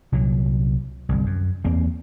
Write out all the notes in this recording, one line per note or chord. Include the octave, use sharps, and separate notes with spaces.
C2 A#2 F#3
G1 C2
F#2
E2 A#3 C4